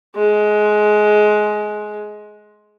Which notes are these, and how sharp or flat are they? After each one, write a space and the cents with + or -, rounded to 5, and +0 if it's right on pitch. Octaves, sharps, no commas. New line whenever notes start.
G#3 +20